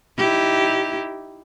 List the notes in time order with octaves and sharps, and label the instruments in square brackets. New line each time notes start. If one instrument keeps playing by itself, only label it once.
[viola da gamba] D#4 E4 G4